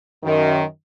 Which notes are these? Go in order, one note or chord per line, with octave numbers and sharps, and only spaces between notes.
F#2 D#3